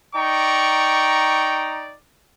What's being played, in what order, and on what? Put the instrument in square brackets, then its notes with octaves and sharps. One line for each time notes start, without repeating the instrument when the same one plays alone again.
[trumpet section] D#4 D5 G5 A#5 C#6